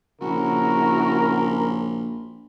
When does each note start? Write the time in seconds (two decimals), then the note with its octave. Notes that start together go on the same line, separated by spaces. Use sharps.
0.21 A#1 C#3 E4 F#4 A#4